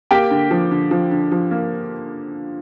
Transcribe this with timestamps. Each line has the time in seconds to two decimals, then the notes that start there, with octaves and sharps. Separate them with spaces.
0.11 A#3 G4 G5
0.31 D3
0.51 F3
0.71 D3
0.91 F3
1.11 D3
1.32 F3
1.51 A#3